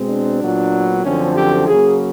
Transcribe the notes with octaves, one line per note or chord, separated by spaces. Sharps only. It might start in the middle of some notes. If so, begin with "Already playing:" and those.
Already playing: B2 G#3 C4
D4
A#2 F#3 B3
F#2 D3 F3 A3 C4 C#4
G4
C#3 F#3 A#3 G#4